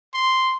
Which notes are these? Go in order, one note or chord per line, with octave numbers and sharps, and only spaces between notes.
C6